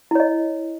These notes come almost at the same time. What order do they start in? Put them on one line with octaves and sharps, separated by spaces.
E4 C#5 D#5